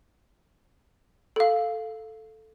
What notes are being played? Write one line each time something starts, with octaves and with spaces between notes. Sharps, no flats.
A4 F5